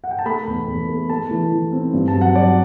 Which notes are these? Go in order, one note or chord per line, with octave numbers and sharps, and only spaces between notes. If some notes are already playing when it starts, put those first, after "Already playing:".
F#5
G5
A5
A3 B5
E2
E2
A3
A3 A5
E3
E3
C4
G2
A5
F#3
F#5
F#3 D5